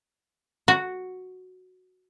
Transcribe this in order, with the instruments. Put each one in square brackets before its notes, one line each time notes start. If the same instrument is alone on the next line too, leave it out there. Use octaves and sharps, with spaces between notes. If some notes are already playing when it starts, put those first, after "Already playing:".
[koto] F#4